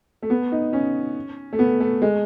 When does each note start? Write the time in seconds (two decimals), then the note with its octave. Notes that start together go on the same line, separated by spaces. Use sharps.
0.22 A3
0.30 B3
0.52 D#4
0.73 C#4
1.53 A3
1.59 B3
1.80 A3
2.02 G#3